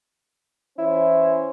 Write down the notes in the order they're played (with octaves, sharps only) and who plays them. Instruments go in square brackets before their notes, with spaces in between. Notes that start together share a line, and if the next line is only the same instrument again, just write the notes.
[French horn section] E3 C#4 C5 [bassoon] E4